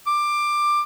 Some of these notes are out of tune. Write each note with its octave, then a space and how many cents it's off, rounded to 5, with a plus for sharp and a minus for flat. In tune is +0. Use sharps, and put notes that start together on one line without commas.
D6 +15